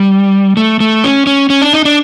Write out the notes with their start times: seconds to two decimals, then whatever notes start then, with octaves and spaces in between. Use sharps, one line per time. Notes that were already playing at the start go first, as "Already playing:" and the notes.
Already playing: G3
0.57 A3
0.80 A3
1.04 C#4
1.27 C#4
1.50 C#4
1.62 D4
1.73 D#4
1.85 D4